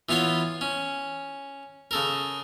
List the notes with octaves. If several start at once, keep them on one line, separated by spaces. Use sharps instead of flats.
E3 B3 F4 C#5 C6
C#4
C#3 A4 A#4